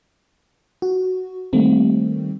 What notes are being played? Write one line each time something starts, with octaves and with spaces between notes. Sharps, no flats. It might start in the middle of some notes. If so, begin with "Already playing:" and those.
F#4
D#3 G3 A3 A#3 C4